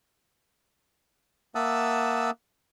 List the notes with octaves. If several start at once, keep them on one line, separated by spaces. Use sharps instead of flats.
A#3 E5 F#5 A5 D#6 E6